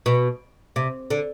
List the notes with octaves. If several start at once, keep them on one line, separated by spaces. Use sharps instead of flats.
B2
C3
D3